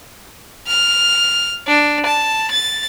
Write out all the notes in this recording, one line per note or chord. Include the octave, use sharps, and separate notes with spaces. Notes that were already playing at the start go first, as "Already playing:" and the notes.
F6
D4
A5
A6